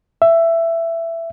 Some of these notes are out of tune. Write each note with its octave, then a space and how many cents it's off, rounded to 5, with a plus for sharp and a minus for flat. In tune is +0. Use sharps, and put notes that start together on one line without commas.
E5 +15